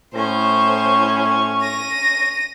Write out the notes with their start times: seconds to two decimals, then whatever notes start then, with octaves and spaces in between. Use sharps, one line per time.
0.15 A2 C#4 C5 C#6
1.62 A#6 D#7